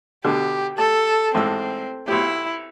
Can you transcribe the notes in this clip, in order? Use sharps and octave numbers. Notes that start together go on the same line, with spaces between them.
B2 D3 G4
A4 A5
A1 G#2 C4 E6
B1 E4 G4